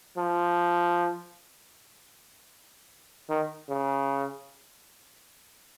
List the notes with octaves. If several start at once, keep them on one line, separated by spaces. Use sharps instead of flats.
F3
D#3
C#3